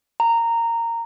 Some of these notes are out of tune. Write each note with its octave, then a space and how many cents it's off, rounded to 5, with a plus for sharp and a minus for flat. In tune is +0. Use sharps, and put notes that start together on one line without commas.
A#5 -15